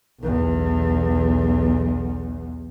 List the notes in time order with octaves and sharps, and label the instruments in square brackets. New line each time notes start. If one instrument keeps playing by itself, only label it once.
[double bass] B1 E2